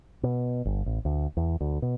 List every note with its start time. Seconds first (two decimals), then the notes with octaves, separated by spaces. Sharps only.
0.23 B2
0.65 G1
0.86 A1
1.05 D2
1.37 E2
1.61 D2
1.82 B2